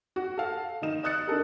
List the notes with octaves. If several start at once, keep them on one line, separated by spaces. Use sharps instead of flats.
F#4
A4 F5
D#3 D#4 E7
D#5 D#6 F#6 A6 C#7
D4 D#4 A4 A#4